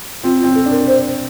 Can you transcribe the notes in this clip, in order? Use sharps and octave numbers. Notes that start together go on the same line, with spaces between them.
C4 F4
F4
C4
A4
D4
A#4
C5